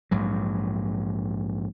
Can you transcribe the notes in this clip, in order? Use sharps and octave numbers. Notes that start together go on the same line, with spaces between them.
A#1 G#2 F#3